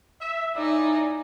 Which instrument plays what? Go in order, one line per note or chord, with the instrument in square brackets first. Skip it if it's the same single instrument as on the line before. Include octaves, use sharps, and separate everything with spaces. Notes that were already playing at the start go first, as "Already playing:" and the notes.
[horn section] E5
[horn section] A2 E4 D5 [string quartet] D#4 G#5